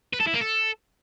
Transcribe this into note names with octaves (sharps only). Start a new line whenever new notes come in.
B4
A4
E4
A#3
A4